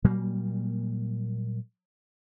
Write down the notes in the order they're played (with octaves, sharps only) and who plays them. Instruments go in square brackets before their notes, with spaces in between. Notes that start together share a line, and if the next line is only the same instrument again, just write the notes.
[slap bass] A#2 F#3 G3 A#3